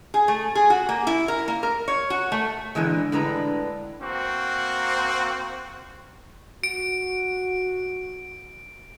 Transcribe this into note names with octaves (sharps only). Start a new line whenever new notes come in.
G#4
A3
G#4
F#4
A#3
E4
A#4
A#3
A#4
C#5
F#4
A3
A#2 D3 E3 G#3
A2 D3 G#3 B4 A#5
A#3 C4 F#4
F#4 D7